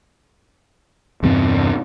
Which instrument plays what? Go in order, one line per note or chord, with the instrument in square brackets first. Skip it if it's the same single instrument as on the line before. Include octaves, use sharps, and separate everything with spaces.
[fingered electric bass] E2 G2 C3 C4